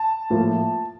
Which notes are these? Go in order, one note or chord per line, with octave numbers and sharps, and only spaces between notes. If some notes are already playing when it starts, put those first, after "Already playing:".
Already playing: A5
A2 F3 A#3